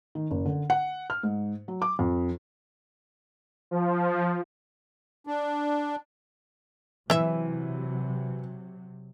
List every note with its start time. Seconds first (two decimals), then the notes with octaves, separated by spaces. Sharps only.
0.15 D#3
0.31 F#1
0.45 D3
0.70 F#5
1.10 F6
1.23 G#2
1.68 F#3
1.82 D6
1.99 F2
3.71 F3
5.27 D4
7.10 C3 E3 F#3 E4 E5